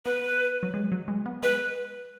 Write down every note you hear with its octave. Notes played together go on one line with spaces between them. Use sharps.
B3 B4
F#3
G#3
F#3
G#3
B3
G#3 B4